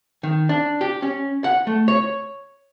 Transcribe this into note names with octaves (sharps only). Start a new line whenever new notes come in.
D#3
D4
G4
C#4
F#5
A3
C#5